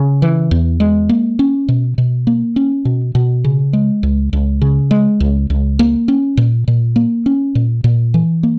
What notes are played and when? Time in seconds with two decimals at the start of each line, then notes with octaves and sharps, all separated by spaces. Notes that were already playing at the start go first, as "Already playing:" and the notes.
Already playing: C#3
0.22 E3
0.51 E2
0.80 G#3
1.09 A#3
1.39 C#4
1.69 B2
1.98 B2
2.27 A#3
2.56 C#4
2.85 B2
3.15 B2
3.44 C#3
3.73 G#3
4.03 C#2
4.33 C#2
4.62 C#3
4.91 G#3
5.20 C#2
5.50 C#2
5.79 A#3
6.08 C#4
6.37 A#2
6.68 A#2
6.96 A#3
7.26 C#4
7.55 A#2
7.84 A#2
8.14 E3
8.43 A#3